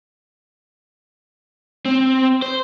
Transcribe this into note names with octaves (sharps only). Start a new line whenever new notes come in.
C4
C5